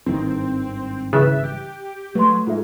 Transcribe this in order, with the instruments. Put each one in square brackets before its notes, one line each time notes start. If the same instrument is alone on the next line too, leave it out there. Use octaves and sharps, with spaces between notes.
[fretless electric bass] G#1 G2 D#3 [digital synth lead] C4 [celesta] E4
[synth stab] C#3 E3 [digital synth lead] E5 [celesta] F#6 A6
[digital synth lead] G4
[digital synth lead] F#3 [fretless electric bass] A3 [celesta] B4 C6
[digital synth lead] G#2 [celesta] F4 A4 E5